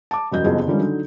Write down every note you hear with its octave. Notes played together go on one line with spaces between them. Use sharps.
A5 D6
E1 F#2 G3 F#4 D#5 G6
F#1 F2 B3 G4 G#4 D#5
D3 D#3 F3 G3 G#3 C#4
D3 F#3 D#4